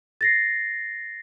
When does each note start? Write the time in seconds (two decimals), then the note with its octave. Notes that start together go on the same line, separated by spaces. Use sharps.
0.21 A6 A#6 C7